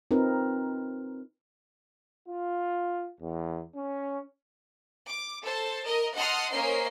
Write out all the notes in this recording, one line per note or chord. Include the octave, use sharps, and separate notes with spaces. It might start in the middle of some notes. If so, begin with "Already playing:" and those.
C4 D#4 F4 A#4 B4
F4
E2
C#4
D6
A4 C5 A5
A#4 D#5
D#5 F#5 A5 C6 D#6 F6
A#3 C#4 A#4 C5 D#5 C7